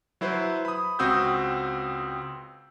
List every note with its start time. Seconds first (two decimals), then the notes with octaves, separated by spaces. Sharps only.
0.21 F#3 E4 B4 C5
0.65 B5 D#6
0.99 C#2 C4 F#4 D#6 E6 G6